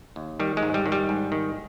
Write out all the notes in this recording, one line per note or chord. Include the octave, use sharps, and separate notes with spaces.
D#2
D#3 G3
G#3
G#2
G3
D#3
G3
G#2
D#3